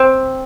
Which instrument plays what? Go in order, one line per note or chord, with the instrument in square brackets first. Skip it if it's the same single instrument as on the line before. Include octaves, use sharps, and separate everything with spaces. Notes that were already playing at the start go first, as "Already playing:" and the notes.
Already playing: [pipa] C4